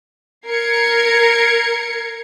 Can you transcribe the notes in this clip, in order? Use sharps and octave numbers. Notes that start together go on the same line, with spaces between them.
A#4 G#6 C7 C#7